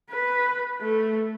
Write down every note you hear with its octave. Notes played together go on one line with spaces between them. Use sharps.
B4
A3